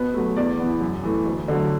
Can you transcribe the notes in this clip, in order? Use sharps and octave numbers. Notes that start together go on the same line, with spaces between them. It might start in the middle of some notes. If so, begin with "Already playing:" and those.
Already playing: B2 B4
F#3 A3
E2 D5
E3 B3
F#2
E3 A3
D2
D3 F#3